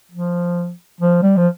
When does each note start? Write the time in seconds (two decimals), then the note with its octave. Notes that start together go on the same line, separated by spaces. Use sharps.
0.11 F3
1.01 F3
1.22 G3
1.37 F3